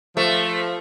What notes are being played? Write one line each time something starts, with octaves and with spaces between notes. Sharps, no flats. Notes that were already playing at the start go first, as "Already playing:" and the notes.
F3 A3